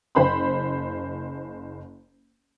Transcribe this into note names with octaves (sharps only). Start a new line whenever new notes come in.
F#1 C5 B5 C6